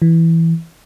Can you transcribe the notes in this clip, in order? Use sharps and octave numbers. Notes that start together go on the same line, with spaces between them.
E3